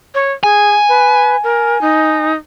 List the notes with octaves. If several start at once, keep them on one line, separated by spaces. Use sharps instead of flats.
C#5
G#4 G#5
B4
A#4
D#4